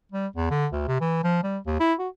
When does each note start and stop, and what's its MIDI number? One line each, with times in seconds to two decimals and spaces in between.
0.12 0.27 55
0.36 0.48 40
0.50 0.66 50
0.72 0.82 38
0.88 1.00 48
1.01 1.20 52
1.24 1.43 53
1.43 1.58 55
1.66 1.76 39
1.80 1.93 64
1.99 2.08 66